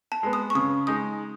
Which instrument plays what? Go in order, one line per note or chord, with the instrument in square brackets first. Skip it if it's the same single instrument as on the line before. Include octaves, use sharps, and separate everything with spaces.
[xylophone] A5
[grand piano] G#3 B3
[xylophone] D#6
C#6
[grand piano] C#3 [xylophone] D#6
[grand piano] G#3 D#4 [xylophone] D#6